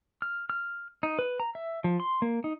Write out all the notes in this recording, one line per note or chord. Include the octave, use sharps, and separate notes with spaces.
F6
F6
D#4
B4
A#5
E5
F3
C6
A#3
D#4